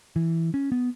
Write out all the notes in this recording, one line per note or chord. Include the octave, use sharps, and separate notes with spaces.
E3
C#4
B3